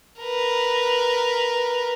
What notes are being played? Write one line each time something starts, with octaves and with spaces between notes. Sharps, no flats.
A#4 B4